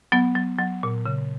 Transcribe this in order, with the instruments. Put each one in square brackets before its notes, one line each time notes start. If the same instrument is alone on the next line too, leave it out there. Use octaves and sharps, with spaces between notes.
[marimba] F#3 B3
F#3
F#3
A#2
C#3